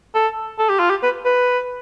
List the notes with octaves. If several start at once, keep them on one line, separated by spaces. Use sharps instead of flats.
A4
A4
G4
F4
G4
B4
B4